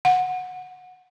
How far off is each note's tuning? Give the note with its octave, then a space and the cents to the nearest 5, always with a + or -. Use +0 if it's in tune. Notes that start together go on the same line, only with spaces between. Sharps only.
F#5 -15